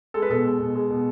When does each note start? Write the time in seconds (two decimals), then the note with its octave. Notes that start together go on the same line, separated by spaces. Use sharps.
0.14 G#3 A4
0.22 B4
0.30 B2 A4
0.44 G#3
0.60 B2
0.75 G#3
0.90 B2